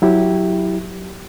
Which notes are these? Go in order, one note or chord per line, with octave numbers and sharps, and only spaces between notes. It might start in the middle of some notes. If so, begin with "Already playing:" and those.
F#3 E4 G4